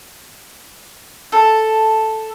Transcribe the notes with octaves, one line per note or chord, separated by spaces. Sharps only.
A4